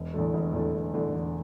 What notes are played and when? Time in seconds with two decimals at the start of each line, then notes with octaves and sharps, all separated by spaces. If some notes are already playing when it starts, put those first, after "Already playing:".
Already playing: E1
0.14 E2 D3 A3
0.34 E1
0.53 E2 D3 A3
0.74 E1
0.94 E2 D3 A3
1.13 E1